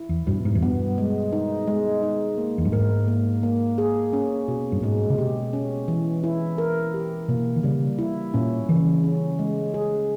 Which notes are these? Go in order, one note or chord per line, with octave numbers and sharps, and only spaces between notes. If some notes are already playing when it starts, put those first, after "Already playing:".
Already playing: E4
E2
G2 B2
G#2
E2
G2 B3
G#3
D#4
G#3
D#4
A#3
E2
G2
G#2 A#4
A#3
A#3
G#4
C#4
B2
G2
G#2 G#3
C#3
B2 G4
C#4
E3
E4
A#4
G4
B2 A#3
D#3
C#3 G3
E4
A#2 C#4
C#3 E3
C#4
G#3
G#4